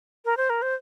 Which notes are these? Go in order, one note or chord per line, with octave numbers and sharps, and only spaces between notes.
A#4
C5
A#4
C5